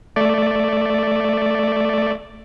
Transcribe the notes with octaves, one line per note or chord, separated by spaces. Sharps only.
A3 D5